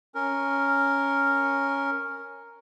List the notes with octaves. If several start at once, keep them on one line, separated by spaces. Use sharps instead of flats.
C#4 A#4